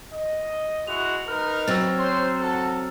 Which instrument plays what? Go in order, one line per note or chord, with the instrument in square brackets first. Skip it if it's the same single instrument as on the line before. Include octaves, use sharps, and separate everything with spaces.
[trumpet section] D#5
[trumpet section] G#3 E4 F#4 [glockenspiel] F7
[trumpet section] D#4 A#4 B4 [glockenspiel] F6
[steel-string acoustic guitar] F#3 C4 [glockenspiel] E6 A6
[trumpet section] C5 C#5 C6
F#4 A4